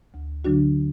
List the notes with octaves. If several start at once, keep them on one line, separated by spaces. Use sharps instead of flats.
D2
D3 F#3 D4 F#4